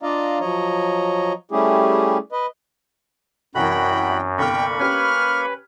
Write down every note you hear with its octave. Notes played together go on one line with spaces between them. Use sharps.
D4 F4 D5 D#5 F5 A#5
F3 F#3 C#5 D#5 A#5
G3 A3 C#4 E4 G4 G#4
B4 D#5
C2 F#2 E3 F#4 A#4 G5 B5 F#6
G1 C2 A#3 G5 B5 C#6 F6
C#4 G4 B4 F6